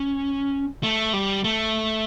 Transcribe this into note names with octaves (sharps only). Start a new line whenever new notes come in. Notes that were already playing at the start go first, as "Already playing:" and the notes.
Already playing: C#4
A3
G3
A3